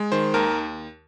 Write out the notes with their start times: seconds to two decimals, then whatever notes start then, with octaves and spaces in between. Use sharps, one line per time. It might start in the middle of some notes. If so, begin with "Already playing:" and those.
Already playing: G#3
0.12 D#3 C5
0.34 D#2 A#4